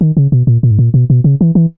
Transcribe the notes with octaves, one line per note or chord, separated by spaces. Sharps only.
D#3
C#3
B2
A#2
A#2
G#2
A#2
B2
B2
C#3
E3
E3